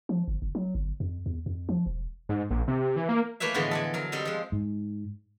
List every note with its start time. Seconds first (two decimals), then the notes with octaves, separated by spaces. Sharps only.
0.09 F3
0.28 G1
0.42 F#1
0.55 F#3
0.75 G1
1.00 F2
1.26 E2
1.46 F2
1.69 F3
1.86 E1
2.29 G#2
2.50 A#1
2.68 C3
2.96 E3
3.09 A#3
3.40 E3 A3 A#3 B4 C#5 E5
3.54 A2 D3 E3 F3 G#3 B3
3.71 A4 D5 G#5
3.94 F#3 A#4
4.12 G3 C4 A4 D#5
4.25 F3 G#3
4.52 G#2